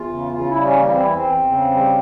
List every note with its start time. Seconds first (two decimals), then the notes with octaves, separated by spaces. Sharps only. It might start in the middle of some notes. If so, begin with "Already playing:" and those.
Already playing: E2 F4
0.09 C#3
0.32 C#3 F4
0.48 E4
0.55 G3
0.63 C#4
0.78 E3 A#3
0.89 C4
1.01 E2 E4
1.13 C4
1.24 E2
1.47 C#3
1.70 G3